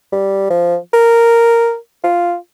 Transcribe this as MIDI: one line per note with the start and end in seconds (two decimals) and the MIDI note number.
0.12 0.47 55
0.50 0.76 53
0.93 1.76 70
2.04 2.35 65